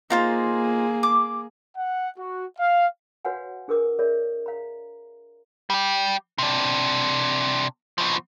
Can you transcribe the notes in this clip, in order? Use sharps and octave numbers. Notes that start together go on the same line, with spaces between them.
A#3 D#4 F4 G#4 C5
D6
F#5
F#4
F5
F#4 B4 C#5 F5 F#5 G#5
D4 G#4 A#4 B4 D6
G#4 A#4 C#5 D5 E5
F5 A#5
G3 G4
C3 D4
B2 F3